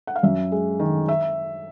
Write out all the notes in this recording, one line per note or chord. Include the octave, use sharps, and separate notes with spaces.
F#5
F5
F#2 E5
G#3
D#3
E5